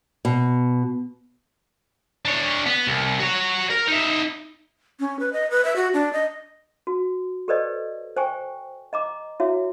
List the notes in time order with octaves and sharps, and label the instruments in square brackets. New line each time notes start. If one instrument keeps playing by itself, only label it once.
[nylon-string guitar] B2
[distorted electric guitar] D4 C#5
B3
C2
F#4 C#5
A#4
D#4 E5
[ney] C#4
B4
D#5
B4
E5
F#4
D4
D#5
[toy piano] F#4
G4 A4 B4 C5 D5 D#5
C5 G5 G#5 C#6
D#5 A#5 D6
E4 F#4 C#5 E5